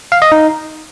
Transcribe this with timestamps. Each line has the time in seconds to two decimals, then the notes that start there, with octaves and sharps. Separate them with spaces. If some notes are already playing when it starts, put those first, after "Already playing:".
0.12 F5
0.22 D#5
0.32 D#4